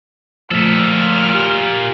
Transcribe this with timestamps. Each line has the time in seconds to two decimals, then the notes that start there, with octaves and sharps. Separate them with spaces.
0.51 A#2 F3 A3 A4 F6 B6
1.35 G4